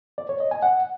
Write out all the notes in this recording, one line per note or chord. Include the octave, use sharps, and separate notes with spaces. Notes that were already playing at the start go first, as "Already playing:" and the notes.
D5
C#5
D#5
G#5
F#5